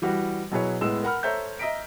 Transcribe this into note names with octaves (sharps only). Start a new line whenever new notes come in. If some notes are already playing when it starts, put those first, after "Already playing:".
E3 G3 F#4
B2 F#3 E4 G#4 B4 C#5
A2 G#3 B3 E6 E7
A#4 F#5 B5 F6
A4 C5 C#5 E5 A#5 G6
D#5 E5 A#5 B6 D7